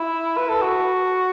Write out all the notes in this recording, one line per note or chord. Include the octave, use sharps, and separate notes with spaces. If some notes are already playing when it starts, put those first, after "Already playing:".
Already playing: E4
B4
A4
F#4